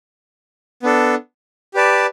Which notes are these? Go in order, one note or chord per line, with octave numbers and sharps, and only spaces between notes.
B3 D4 A4
G4 B4 D5 A5